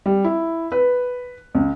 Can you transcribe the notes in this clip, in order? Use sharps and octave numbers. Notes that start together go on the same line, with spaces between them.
G3
E4
B4
C#2